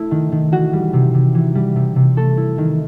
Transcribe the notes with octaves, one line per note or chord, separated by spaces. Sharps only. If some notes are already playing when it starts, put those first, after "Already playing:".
Already playing: A3 E4
D#3
D#3
E3 F#4
G3
C3
C3
E3
G3
C3
C3
A3 A4
E4
D#3